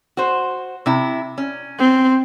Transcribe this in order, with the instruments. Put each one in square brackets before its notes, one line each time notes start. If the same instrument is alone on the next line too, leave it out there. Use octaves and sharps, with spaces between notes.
[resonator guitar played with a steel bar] F#4 C5
C3 E4
C#4
[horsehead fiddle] C4